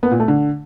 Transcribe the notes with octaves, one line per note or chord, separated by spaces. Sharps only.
B3
A#2
A3
D3